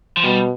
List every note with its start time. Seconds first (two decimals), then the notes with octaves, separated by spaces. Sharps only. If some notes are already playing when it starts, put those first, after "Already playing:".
0.17 F3
0.23 B2 G3